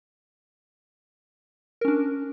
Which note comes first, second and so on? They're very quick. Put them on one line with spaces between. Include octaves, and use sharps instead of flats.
A#4 C#4 D4